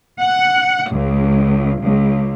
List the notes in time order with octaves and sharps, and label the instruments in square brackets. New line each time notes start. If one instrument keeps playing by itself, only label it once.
[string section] F#5
C#2
C#2